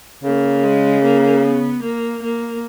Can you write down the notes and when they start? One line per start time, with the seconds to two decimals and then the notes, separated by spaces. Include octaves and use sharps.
0.24 C#3 A#3
0.63 G#3
1.04 A#3
1.43 B3
1.83 A#3
2.23 A#3